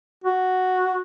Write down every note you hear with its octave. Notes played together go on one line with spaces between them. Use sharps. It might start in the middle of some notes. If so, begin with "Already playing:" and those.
F#4